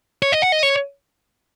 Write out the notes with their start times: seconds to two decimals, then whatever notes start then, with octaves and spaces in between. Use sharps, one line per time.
0.22 C#5
0.32 D#5
0.42 F#5
0.52 D#5
0.63 C#5